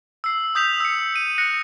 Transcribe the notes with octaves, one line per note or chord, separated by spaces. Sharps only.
E6 C7
D#6 G6 B6 F7
E6 C#7
D#7
F#6 A#6 C#7